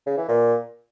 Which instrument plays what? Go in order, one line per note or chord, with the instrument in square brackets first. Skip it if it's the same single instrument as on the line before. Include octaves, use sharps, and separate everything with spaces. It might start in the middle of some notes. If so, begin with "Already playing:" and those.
[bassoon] C#3
E3
A#2